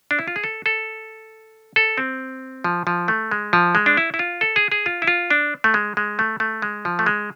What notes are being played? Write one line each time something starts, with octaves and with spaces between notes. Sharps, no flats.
D4
E4
F4
G#4
A4
A4
A4
C4
F3
F3
A3
G#3
F3
G#3
D4
E4
E4
F4
A4
G#4
G#4
F4
E4
F4
D4
A3
G#3
G#3
A3
A3
G#3
F3
A3
G#3